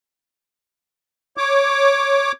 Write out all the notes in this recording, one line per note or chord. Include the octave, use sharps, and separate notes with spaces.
C#5 D6